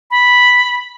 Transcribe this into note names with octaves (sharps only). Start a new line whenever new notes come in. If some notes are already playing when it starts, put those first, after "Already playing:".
B5